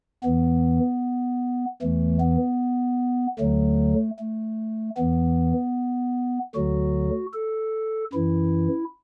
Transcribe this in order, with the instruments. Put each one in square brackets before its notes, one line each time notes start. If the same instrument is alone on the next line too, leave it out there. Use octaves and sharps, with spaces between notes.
[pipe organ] E2 E3 B3
E2 E3 A3
B3
D2 D3 F#3 A3
A3
E2 E3 B3
D2 D3 F#3 F#4
A4
F#2 E3 E4